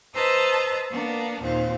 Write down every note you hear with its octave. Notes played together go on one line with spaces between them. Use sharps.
B4 C5 D#5 A5 A#5 E6
A#3 B3 D4 A#4
D#2 A#2 C4 F5